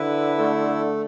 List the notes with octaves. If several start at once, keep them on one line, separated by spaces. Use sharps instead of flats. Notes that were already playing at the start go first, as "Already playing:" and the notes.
Already playing: D3 E4 B4
A3